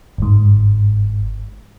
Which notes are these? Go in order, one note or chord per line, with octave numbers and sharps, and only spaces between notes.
G1 G#2